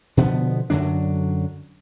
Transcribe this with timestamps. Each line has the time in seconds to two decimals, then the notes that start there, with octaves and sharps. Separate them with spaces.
0.17 B2 D3 F3 B3
0.70 F#2 D3 F#3 D4